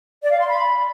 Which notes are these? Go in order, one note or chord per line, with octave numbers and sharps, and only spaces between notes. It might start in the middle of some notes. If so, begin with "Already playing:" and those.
D5
F5
C6
B5